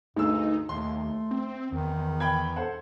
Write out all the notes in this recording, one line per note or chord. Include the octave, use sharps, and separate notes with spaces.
D2 G2 D#4 G#4 E6
D#2 A3 C6
C4
E2 D#3
G5 B5 G#6
A4 C5 F#5